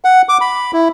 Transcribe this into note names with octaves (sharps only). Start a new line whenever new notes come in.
F#5
D6
B5
E4